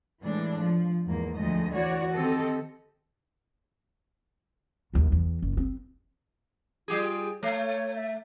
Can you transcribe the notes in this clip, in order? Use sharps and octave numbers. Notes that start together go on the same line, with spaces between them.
A2 E3 G#3 D4
F3
E2 G#2 A#3
D2 F3 G#3 A3 D#5
E3 F#4 C#5 D5
D#3 C4 G4 A4 D#5
A#1 D#2
E2
F#1
C4
G3 F4 G4 G#4
A3 C#5
E5